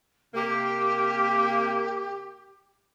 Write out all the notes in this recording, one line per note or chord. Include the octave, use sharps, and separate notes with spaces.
C3 A#3 G4